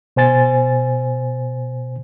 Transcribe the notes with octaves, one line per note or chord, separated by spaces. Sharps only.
B2 C5 G#5 A6